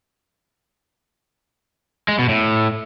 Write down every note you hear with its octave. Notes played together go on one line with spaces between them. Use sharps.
G#3
B2
A2